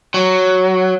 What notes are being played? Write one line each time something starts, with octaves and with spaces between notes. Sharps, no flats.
F#3